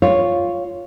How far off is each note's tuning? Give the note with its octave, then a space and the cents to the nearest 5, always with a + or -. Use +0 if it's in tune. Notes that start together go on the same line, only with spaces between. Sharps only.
F4 +0 C#5 +0